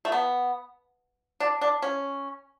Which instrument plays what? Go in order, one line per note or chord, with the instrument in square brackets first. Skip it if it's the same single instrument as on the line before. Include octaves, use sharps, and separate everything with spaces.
[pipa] A3
B3
D4
D4
C#4